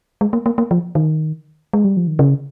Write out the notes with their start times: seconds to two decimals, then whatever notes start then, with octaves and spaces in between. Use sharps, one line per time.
0.21 G#3
0.33 A#3
0.46 A#3
0.58 A#3
0.71 F3
0.95 D#3
1.73 G#3
1.84 G3
1.97 F3
2.07 D#3
2.19 C#3